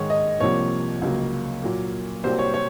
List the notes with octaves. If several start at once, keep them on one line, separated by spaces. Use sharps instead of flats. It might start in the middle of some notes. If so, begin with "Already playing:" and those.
Already playing: G#2 D#3 G#3 C#5
D#5
C2 C3 F3 A#3 C#5
C#2 C#3 F#3 A#3
A#2 F#3 A#3
C2 C3 F#3 A#3 C5
C#5
C#5